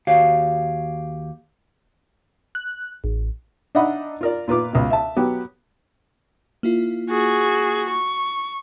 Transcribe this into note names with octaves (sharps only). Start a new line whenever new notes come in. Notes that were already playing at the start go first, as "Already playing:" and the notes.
D#2 F#4 G4 C#5 F5
F#6
A1
D4 D#4 D#5 E5 F#5 B5
F4 A#4 D5
A#2 F4 B4 D6
C#2 B2
E5 A5
F#3 B3 G4
A#3 E4 F4
F#4 G#4
C#6